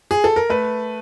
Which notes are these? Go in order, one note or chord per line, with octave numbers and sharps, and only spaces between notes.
G#4
A4
A#4
A3 B4